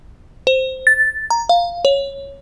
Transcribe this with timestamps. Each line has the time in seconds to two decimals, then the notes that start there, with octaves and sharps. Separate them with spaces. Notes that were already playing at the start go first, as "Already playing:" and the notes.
0.47 C5
0.87 A6
1.30 A#5
1.49 F5
1.85 C#5